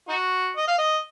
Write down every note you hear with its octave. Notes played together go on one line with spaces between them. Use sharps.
D#4 F#4
D#5
F5
D#5